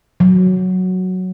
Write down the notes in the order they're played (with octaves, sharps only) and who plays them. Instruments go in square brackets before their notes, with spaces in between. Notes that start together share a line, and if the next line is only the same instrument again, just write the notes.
[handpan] F#3